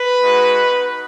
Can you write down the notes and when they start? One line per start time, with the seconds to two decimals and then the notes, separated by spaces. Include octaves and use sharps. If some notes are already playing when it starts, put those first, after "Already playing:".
Already playing: B4
0.21 G#3 D#4 F#4
0.70 B3 D#4 F#4